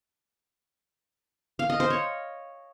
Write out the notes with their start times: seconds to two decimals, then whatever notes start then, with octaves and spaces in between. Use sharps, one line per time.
1.59 F5
1.70 D#5
1.80 C5
1.90 C#5